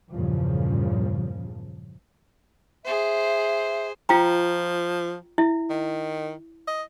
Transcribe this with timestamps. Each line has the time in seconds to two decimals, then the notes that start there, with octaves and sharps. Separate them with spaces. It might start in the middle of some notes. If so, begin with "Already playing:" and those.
0.13 E2 G2 A#2 C#3 F3
2.85 G#4 C5 E5
4.09 F3 F4 G5 A#5
5.38 E4 E5
5.70 D#3
6.67 D#5